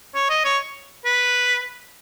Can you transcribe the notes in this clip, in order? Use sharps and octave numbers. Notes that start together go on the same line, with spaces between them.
C#5
D#5
C#5
B4